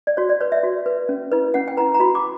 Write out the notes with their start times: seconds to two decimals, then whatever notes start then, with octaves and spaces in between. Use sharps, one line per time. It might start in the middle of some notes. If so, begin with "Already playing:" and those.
0.07 D5
0.17 F#4 C#5
0.29 D5
0.40 B4 C#5
0.52 E5
0.63 F#4
0.86 B4
1.09 C#4
1.32 E4 B4
1.54 C#4 F#5
1.68 G5
1.77 E4 B4 A#5
1.94 A#5
2.00 F#4 B5
2.15 D6